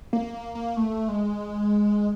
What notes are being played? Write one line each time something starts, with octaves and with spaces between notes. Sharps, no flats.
A#3
A#3
A#3
A3
G#3